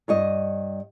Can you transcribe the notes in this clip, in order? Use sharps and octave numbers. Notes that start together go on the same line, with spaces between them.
G2 C#5 D#5